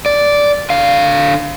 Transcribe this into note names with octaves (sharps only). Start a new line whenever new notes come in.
D5
D3 F5